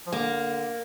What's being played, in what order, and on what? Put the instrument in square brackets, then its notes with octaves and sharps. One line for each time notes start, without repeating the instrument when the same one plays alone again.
[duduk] F3
[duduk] D3 [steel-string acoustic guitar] A#3